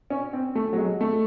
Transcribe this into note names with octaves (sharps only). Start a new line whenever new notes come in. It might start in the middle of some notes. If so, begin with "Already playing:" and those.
C#4
C4
A3
F#3
G#3
A3